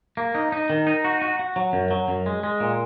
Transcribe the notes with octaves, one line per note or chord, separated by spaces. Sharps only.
A#3
D#4
D#4
D#3
D#4
F#4
F#4
F#4
F#3
F#2
F#3
F#2
G#3
G#3
A#2